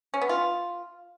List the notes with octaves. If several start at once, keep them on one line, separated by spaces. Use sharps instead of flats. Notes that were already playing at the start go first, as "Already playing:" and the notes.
C#4
B3
F4